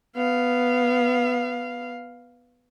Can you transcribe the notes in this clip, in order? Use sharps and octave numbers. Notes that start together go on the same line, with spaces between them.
B3 F5